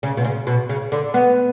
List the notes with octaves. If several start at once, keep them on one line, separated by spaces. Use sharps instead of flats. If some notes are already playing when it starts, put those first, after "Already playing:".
C#3
B2
C#3
B2
C#3
D3
B3